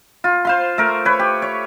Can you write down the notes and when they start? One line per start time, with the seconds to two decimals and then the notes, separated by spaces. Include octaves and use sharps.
0.24 F4
0.45 C5 F5 C6
0.78 A3 A#4
1.05 B4 C#5
1.19 G4
1.42 C#5